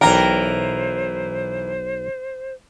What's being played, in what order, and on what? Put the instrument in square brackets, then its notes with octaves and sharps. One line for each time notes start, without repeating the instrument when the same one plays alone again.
[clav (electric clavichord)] B1 D5 [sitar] E3 A#4 [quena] C5 [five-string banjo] G5 A#5